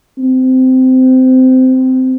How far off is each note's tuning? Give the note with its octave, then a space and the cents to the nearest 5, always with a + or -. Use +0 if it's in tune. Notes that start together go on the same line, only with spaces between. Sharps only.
C4 -20